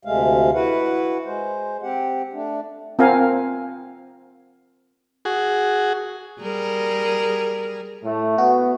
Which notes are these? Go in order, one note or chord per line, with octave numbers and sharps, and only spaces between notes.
D2 C3 G#3 A3 F5
E4 F#4 B4 F#5
G#3 C5
C4 G4 F#5
A3 D4
C4 F4 A#4 F5 F#5 G#5
F#4 G#4
G3 G#4 A#4
A2 A3
B3 F#4